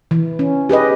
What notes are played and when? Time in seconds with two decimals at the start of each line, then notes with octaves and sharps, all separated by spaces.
0.11 E3
0.39 C#4
0.69 G4 G#4 B4 D#5